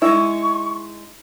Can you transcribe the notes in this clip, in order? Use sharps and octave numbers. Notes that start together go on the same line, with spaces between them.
G#3 D#4 E4 C#6